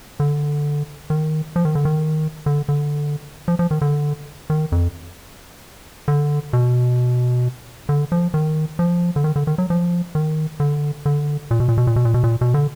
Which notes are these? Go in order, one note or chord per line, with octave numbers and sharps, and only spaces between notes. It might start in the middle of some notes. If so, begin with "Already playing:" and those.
D3
D#3
F3
D#3
D3
D#3
D3
D3
F3
F3
D#3
D3
D#3
F2
D3
B2
D3
F3
D#3
F3
D3
D#3
D3
D#3
F#3
F3
D#3
D3
D3
A#2
B2
A#2
B2
A#2
B2
A#2
B2
A#2
B2
D3